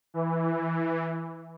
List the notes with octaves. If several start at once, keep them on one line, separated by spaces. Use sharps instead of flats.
E3